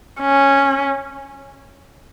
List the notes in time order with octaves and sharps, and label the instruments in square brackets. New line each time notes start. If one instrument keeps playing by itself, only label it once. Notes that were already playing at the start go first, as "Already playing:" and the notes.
[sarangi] C#4